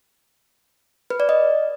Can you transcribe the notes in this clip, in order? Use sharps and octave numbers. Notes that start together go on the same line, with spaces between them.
B4
D5
D#5